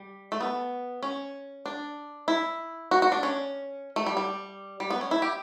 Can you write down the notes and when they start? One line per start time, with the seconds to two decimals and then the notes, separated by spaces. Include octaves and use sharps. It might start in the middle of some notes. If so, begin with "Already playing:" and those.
Already playing: G3
0.32 A3
0.41 B3
1.03 C#4
1.66 D4
2.28 E4
2.91 F#4
3.02 F#4
3.12 D4
3.23 C#4
3.96 A3
4.06 G3
4.17 G3
4.80 G3
4.90 B3
5.01 C#4
5.11 E4
5.22 G4